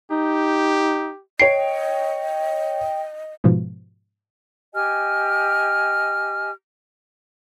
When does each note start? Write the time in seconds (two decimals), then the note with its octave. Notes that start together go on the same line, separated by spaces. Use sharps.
0.11 D#4 G4
1.39 C#5 D#5 G5 C7 D7
3.44 G#2 B2 F3
4.74 G4 D#5 G#5 F6